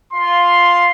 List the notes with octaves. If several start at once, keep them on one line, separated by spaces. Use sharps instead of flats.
F4 C6